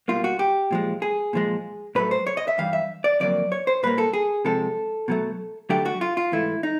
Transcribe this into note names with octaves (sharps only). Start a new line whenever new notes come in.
B2 G3 A#3 F4
F#4
G4
A#2 F3 G#3
G#4
A#2 F3 G#3
A2 F#3 A3 B4
C5
C#5
D#5
E5
G2 E3 G3 F5
E5
D5
F2 D3 F#3 A#3 D5
C#5
C5
A#2 G3 A#3 B4
A4
G#4
C3 F3 G#3 A4
B2 F#3 A3
F#2 D3 F#3 A3 G4
F#4
F4
F4
G#2 E3 A3 E4
D#4